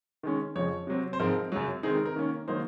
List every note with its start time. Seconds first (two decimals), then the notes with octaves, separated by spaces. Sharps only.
0.23 D#3 G#3 C#4
0.55 F2 C#3 F3 C#5
0.87 C3 F#3 C4
1.13 C5
1.20 G#2 F3 G#3 C4 A#4
1.52 F#2 C#3 F#3
1.83 D#3 G#3 C4 D#4 G#4
1.94 A#4
2.06 A#4
2.16 D#3 A#3 C#4
2.48 D#3 F#3 A#3 D#4 C5